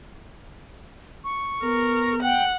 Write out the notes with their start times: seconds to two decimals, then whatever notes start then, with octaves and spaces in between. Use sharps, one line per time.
1.24 C#6
1.63 B3 A#4
2.23 F#5 G5